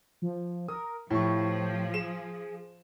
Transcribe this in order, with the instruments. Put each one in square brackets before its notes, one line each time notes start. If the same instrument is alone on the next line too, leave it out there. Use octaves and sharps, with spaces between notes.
[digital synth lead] F3
[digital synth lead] A#4 [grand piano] D#6
[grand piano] A2 G4 C#6 [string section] F3 [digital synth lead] E4
[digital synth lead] G5
[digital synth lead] G#4 [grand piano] E7